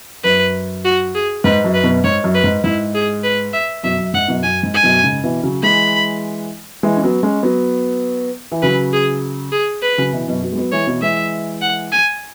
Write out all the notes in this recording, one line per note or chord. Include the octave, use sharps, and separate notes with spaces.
F#2 B4
F#4
G#4
G#2 B4
F#2
B4
F#2 B2
G#2 C#5
F#2
B4
G#2
G#2 E4
G#4
B4
E5
F#2 B2 E5
F#2
G#2 F#5
F#2 B2
F#2 G#5
G#2
G#5
F#2 B2
G#2 C#3
B2 E3
C#3 F#3
E3 G#3 B5
E3 G#3
C#4
F#3 B3
G#3 C#4
F#3 B3
E3
C#3 F#3 B4
G#4
G#4
B4
C#3 F#3
B2 E3
F#2 B2
F#3 B3
G#3
F#3 B3
E3 G#3 C#5
B2 E3
E3 G#3 E5
F#5
G#5